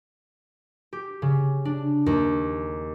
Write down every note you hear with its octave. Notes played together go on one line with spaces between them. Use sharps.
G4
C#3
D4
D#2